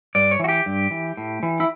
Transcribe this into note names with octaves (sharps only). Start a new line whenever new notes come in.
G2 D5
C#5
E3 F#4
G4
G2
E3
A2
E3
E4